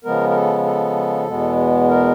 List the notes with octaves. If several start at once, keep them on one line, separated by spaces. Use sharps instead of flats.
C#3 F3 G#3 B3 A#4
A#4
A4
A4
E2 B2 G#3 B3
A#4